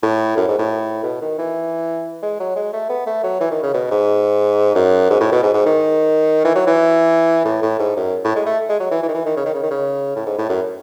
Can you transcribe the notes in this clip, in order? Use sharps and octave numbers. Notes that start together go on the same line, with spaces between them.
A2
F#2
G#2
A2
B2
D#3
E3
G#3
F#3
G#3
A3
B3
A3
F#3
E3
D#3
C#3
B2
G#2
F#2
G#2
A2
B2
G#2
G#2
D#3
E3
F#3
E3
A2
A2
G#2
F#2
A2
G#3
A3
G#3
F#3
E3
E3
D#3
E3
D#3
C#3
D#3
C#3
D#3
C#3
A2
G#2
A2
F#2